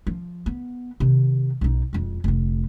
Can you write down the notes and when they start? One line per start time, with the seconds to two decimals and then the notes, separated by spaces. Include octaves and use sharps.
0.07 F3
0.46 B3
1.00 C3 D#3
1.61 B1 D#4
1.93 E1 F2
2.24 F1 D3